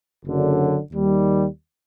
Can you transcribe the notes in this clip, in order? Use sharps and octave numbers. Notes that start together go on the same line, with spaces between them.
F#1 F#2 D3 F#3
D#2 D#3 G3